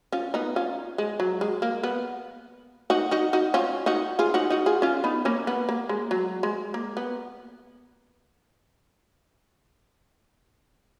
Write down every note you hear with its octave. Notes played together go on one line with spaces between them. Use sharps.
C#4 F4
B3 D#4
C#4 F4
G#3
F#3
G#3
A#3
B3
D#4 F#4
D#4 F#4
D#4 F#4
C#4 F4
D#4 F#4
F4 G#4
D#4 F#4
D#4 F#4
F4 G#4
C#4 F4
B3 D#4
A#3 C#4
B3
A#3
G#3
F#3
G#3
A#3
B3